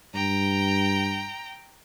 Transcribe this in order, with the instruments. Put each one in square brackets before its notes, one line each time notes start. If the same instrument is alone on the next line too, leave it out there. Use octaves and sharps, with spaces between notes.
[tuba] G2 [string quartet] G5 A#5